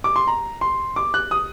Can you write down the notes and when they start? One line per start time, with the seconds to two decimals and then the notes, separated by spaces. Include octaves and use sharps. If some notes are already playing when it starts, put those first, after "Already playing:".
0.04 D6
0.16 C6
0.27 A#5
0.61 C6
0.96 D6
1.14 F#6
1.31 D#6